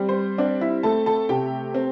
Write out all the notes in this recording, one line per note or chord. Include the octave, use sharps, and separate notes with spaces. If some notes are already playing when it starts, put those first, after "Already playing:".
Already playing: G3 C4
C5
C4 D4 D5
E4 E5
A3 A4 A5
A4 A5
C3 G4 G5
C4